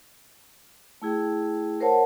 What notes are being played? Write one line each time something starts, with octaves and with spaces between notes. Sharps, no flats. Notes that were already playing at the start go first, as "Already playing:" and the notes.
A3 E4 G#4 G5
A#4 C5 C#5 F#5 A5